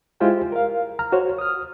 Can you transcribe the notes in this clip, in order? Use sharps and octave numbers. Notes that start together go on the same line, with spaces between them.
G#3 E4 F4 G4 C5 G5
A#4 F5
A#5 F6
F#4 C5 C#5
D#6 F6